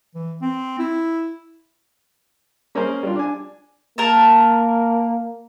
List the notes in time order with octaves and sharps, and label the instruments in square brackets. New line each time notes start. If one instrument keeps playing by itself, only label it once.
[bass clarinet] E3
C4
E4
[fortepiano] A#3 C#4 G#4 A#4 C5
G3 D4 F4
D4 G#5
[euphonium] A#3 [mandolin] A#4 A5